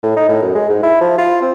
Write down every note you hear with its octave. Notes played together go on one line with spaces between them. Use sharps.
A2
D#4
A2
F#2
G#3
G#2
E4
F3
F4
C4